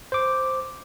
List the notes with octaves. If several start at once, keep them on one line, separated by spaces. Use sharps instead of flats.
C5 D6